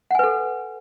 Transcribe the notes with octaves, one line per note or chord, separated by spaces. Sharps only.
A4 B4 F#5 G#5